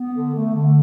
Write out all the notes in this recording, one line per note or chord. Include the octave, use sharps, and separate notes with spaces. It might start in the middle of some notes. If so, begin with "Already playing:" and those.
Already playing: B3
D3
A3
D3